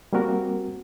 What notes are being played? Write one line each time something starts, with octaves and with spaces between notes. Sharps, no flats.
G3 A#3 C4 F#4 A#4